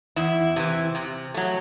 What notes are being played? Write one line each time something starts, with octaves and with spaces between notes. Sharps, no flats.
E2 E4
C3 E3
C3
F#3 A3